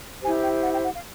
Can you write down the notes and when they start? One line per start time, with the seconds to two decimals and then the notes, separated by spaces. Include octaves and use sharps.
0.22 E4 G4 C5 G#5
0.42 G5
0.62 F#5
0.73 G5
0.84 F#5
0.93 F5